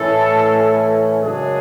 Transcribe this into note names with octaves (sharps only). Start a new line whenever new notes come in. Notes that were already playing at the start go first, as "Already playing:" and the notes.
Already playing: A2 E3 A3 C#4 A4
F#2 C#3 G#3 D4 G#4